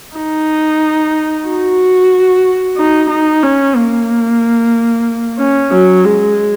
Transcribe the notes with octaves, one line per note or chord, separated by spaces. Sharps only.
D#4
F#4
D#4
D#4
C#4
A#3
C#4
F#3
G#3